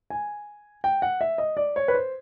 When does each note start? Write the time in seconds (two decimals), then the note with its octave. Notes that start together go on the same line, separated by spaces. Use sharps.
0.10 G#5
0.84 G5
1.02 F#5
1.21 E5
1.38 D#5
1.57 D5
1.76 C#5
1.88 B4
1.94 C5